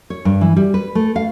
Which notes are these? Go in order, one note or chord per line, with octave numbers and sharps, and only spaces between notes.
C#5
G2
E3
G3
B4
A3
F5